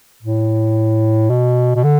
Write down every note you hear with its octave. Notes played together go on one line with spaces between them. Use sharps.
A2
B2
B2
D3